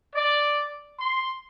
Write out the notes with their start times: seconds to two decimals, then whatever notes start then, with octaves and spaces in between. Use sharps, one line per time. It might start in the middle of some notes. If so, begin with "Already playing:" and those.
0.16 D5
0.99 C6